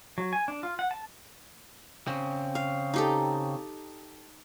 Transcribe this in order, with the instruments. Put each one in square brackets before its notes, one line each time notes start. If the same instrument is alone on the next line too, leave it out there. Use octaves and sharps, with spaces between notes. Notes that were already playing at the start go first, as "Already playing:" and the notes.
[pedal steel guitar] F#3
G#5
D4
F4
F#5
A5
[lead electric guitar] C#3 C4
[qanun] F5
D#4 G4 A4